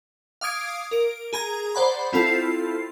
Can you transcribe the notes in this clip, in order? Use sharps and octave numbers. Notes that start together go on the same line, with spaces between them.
F5 D6 D#6 G#6 D7
A#4 D7
G#4 A#5 G#6
C5 D5 F#5 B5
C4 E4 F4 A4 C7